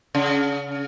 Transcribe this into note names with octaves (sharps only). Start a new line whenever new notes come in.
C#3